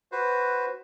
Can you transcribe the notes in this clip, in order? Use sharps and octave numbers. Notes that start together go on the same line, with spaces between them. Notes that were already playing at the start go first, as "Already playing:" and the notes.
F#4 B4 C5